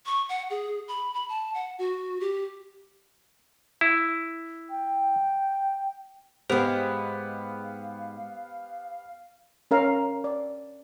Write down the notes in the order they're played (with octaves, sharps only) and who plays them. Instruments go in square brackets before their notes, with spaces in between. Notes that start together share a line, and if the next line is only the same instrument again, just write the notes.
[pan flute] C#6
F#5
G#4
B5
B5
A5
F#5
F#4
G4
[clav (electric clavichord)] E4
[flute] G5
[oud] G#2 G#3 [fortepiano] B3 G4 [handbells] C5 [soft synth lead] F5
[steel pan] C#4 A#4 F5
D5